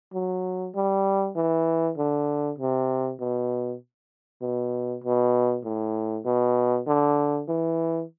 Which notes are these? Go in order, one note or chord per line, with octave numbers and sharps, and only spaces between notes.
F#3
G3
E3
D3
C3
B2
B2
B2
A2
B2
D3
E3